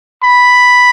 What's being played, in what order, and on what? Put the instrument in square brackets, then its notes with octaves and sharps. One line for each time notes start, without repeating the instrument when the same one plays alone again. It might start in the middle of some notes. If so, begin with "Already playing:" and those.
[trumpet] B5